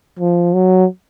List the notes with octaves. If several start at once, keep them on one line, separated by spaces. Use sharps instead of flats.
F3
F#3